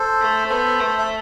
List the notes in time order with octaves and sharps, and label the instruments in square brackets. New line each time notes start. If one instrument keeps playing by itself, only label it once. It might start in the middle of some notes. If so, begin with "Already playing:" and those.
Already playing: [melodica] A4 C5
[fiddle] A3
[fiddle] B3 [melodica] A4 C5
[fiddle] A3
[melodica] E5